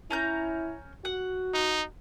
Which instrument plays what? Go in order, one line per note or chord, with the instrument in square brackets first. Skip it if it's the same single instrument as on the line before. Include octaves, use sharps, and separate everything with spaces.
[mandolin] C#4 A#5 G6 [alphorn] E4
[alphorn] F#4 [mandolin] F#5
[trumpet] D#4